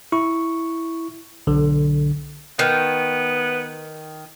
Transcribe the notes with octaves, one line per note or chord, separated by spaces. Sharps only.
E4 C#6
B1 D3
D#3 B3